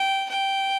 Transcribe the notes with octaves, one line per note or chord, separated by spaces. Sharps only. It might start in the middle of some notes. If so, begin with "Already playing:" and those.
Already playing: G5
G5